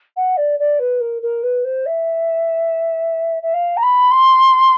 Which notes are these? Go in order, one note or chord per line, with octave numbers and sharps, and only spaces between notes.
F#5
D5
D5
B4
A#4
A#4
B4
C5
E5
E5
F5
A#5
B5
C6